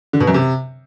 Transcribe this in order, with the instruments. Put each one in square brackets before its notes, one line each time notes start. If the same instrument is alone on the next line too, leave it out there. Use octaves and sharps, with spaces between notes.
[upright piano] D3
B2
F#2
C3